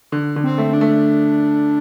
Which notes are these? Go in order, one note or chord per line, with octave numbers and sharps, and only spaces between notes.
D3
D3
C4
A3
D4
A3